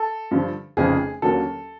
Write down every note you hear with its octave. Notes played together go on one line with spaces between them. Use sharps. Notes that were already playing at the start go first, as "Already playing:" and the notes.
Already playing: A4
G2 D3 F3
F1 F2 C#3 F3 G#4
D#2 D3 F#3 A#3 C#4 A4